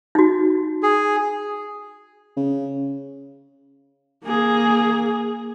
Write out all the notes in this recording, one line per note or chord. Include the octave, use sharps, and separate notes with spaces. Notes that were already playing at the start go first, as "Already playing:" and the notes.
D#4 F#4
G#4
C#3
A#3 G#4